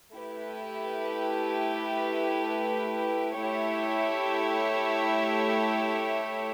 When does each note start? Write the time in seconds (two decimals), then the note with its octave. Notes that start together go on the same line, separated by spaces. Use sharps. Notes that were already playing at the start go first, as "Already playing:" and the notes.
0.14 A3 E4 G4 B4
3.42 A3 E4 G4 C#5 E5